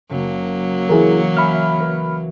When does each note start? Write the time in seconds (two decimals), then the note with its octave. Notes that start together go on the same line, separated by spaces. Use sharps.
0.10 F#1 F#3 A#3
0.89 E3 E4 G#4 A#4
1.37 E5 G#5 B5 F6
1.79 A#4 B4 C#5